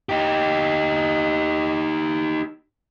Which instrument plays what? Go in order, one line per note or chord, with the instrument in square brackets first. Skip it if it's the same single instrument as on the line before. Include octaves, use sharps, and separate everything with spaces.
[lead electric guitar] D#4 G4